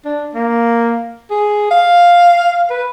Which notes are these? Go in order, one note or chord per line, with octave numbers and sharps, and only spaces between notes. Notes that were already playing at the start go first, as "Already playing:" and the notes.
D4
A#3
G#4
F5
B4